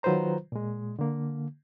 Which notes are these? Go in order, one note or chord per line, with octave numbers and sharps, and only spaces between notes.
D#3 F#3 F4 B4 C5 A#5
A#2 G#3
D3 A#3